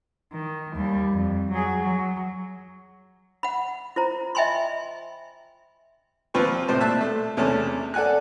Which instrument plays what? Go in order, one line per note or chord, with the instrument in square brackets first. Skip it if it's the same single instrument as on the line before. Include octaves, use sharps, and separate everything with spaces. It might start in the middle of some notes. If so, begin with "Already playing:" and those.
[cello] D#3
D#2 G3
F2
F#3 G#4
F#3
[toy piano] F#5 B5
F4 C5 A#5
D#5 E5 G5 G#5 B5 C6
[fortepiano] D#2 F3 C4 F4 B4 C#6
A2 C3 C5 A5
A#2 E5 A5 F#6
A3
E2 C3 A3 C#4 A5
A4 D5 F#5 G#5 F#6